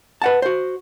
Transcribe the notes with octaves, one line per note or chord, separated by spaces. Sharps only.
B4 F#5 A5
F#4 C5